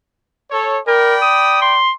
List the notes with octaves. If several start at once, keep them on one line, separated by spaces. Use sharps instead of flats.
A4 C#5
A#4 D5 G5 B5
D#6
C6